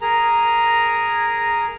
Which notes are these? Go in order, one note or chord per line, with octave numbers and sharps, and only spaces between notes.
G#4 A#4 A#5